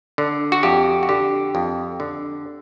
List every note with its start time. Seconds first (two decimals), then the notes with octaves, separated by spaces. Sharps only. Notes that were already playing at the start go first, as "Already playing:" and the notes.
0.18 D3
0.52 F#4
0.63 F2 G4
1.03 F#4
1.09 D3 G4
1.55 F2
2.00 D3